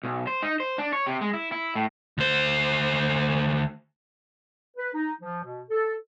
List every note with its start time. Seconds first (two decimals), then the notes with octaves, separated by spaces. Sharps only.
0.03 B1
0.27 C5
0.42 D#4
0.60 C5
0.78 D4
0.92 C#5
1.06 C3
1.21 G#3
1.33 E4
1.52 E4
1.75 A2
2.18 D2 C5
4.77 B4
4.94 D#4
5.21 F3
5.43 B2
5.69 A4